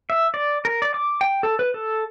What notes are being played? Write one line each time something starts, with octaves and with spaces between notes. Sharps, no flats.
E5
D5
A#4
D5
D6
G5
A4
B4
A4